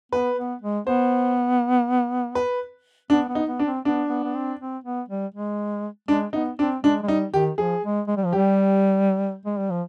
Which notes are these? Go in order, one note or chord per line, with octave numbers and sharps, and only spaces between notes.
B3 B4
B3
G#3
B3 C5
B4
B3 D4
B3
D#4
B3
D4
C4
B3 D4
B3
B3
C4
C4
B3
G3
G#3
G#3 D4
B3 D#4
C4 D4
G#3 D4
G#3
G3 D#4
D#3 G4
F3 G#4
G#3
G#3
G3
F3
G3 G4
G#3
G3
F3